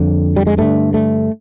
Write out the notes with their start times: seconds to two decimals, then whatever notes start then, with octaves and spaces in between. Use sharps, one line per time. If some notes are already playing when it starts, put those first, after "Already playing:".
Already playing: F2 D3 G3
0.36 G3
0.47 G#3
0.58 G2 D3 A3
0.94 A3